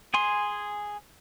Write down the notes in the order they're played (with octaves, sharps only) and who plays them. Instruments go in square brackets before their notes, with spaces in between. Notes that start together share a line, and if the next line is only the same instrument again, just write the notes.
[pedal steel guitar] G#4 G#5 C6